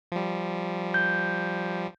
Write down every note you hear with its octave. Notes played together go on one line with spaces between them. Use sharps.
F3 G3
G6